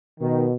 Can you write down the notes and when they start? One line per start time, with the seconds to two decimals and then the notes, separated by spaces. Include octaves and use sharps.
0.21 B2 D#3